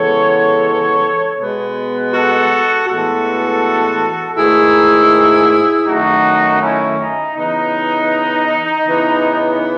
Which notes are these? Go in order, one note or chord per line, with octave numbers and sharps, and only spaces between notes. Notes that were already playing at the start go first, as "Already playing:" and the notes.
Already playing: C#3 E3 G#3 B3 A4 C#5
B2 G#3 B3
F#4 A4
A2 E3 G#3 B3 F#4 A4
G#2 D#3 A3 E4 G#4
F#2 D#3 A3 D#4 F#4
C#4 E4
D#4
C#3 E3 B3 D#4
C#3 E3 B3